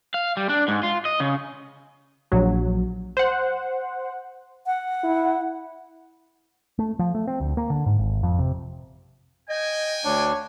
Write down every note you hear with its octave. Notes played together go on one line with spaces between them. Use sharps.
F5
G3
D4
G#2
F4
D#5
C#3
A#1 F#3
C5 F#5
F#5
E4
A3
F3
A3
C4
D2
A#3
D3
G#2
G#1
F2
C3
D#5 G5 G#5
D2 D4 C#5